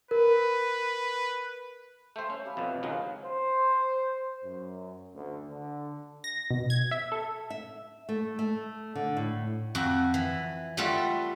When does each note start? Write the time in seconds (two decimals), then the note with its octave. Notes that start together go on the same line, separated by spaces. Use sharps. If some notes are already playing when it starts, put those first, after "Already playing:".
0.11 A#4 B4
2.16 A3 C5 E5 G5
2.30 C#4 E5
2.46 G4 F5 B5
2.57 F2 B2 A3
2.83 C#2 D#3 F#3 G#3 F4
3.24 C5
4.45 F#2
5.15 D2
5.51 D3
6.24 A#6
6.51 B2
6.70 G#6
6.91 E5
7.12 A4
7.50 E5
8.09 A3
8.39 A3
8.95 D3
9.17 A2
9.75 F2 F#4
10.14 E3
10.77 G3 A3 F4 F#4 A4